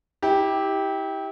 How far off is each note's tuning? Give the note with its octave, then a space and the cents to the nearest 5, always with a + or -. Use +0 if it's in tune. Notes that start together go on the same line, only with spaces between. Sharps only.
E4 -35 G4 +0